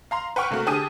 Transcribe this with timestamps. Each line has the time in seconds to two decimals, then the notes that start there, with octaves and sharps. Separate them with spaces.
0.11 F5 A#5 C6
0.36 B4 F#5 G5 C#6 F6
0.51 C3 A3 A#3 F#4
0.66 D3 G4 G#4 A5 D#6 D#7